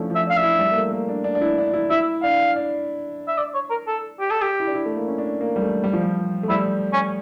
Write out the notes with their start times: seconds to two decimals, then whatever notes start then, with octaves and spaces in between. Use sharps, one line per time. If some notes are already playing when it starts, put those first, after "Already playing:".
Already playing: F3 A3 C#4 D4 E4
0.10 F3
0.15 E5
0.26 D4 F5
0.37 E4 E5
0.59 G3
0.71 A#3
0.76 A3
0.92 A#3
1.09 D4
1.24 D4
1.35 D4
1.41 E4
1.58 D4
1.73 E4
1.90 E4 E5
2.23 D4 F5
2.56 D4
3.28 E5
3.38 D5
3.55 C#5
3.70 A#4
3.87 A4
4.20 G4
4.31 A4
4.42 G4
4.60 E4
4.67 D4
4.74 E4
4.86 A3
4.96 A#3
5.07 C#4
5.18 D4
5.41 A#3
5.56 G3
5.62 A3
5.84 G3
5.93 F3
6.03 G3
6.43 A3
6.49 G3 E4
6.93 C#4